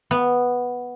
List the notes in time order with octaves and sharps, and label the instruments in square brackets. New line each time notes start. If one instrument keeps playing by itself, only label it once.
[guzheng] B3